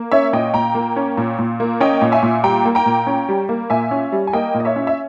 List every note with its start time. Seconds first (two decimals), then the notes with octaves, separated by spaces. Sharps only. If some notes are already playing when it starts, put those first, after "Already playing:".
Already playing: A#3
0.11 C#4 C#5 E5
0.33 A#2 D#5 G5
0.54 A#2 G5 A#5
0.75 A#3
0.96 C#4
1.17 A#2
1.39 A#2
1.60 A#3
1.80 C#4 D#5 G5
2.02 A#2
2.12 E5 G#5
2.23 A#2
2.43 G3 G5 A#5
2.65 A#3
2.75 G5 A#5
2.86 A#2
3.07 C#4
3.29 G3
3.49 A#3
3.70 A#2 E5 G#5
3.91 C#4
4.12 G3
4.27 G#5
4.33 A#3 D#5 G5
4.54 A#2
4.60 D#5
4.65 C#5 E5
4.76 C#4
4.87 E5